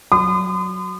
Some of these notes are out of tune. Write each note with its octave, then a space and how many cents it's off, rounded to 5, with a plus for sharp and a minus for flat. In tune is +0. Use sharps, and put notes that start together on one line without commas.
F#3 +0 C6 -45 D#6 -40